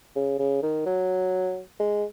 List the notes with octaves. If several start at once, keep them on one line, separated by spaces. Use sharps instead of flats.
C#3
C#3
D#3
F#3
G#3